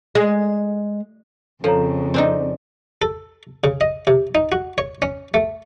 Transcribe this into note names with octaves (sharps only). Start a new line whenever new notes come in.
G#3
F2 C#3 F3 A4 C#5 A#5
C4 D4 D#4 C6
A4
C#3
D#5
C3
D#4
F#4
C#5
C#4
A3